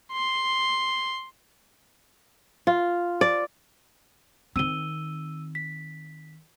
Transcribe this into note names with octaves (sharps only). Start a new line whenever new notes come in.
C6
F4
D5
D#3 C4 E6 D#7 G7
B6